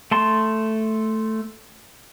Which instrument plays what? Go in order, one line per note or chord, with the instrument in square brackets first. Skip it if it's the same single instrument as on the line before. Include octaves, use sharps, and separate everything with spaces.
[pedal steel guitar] A3 A5 C6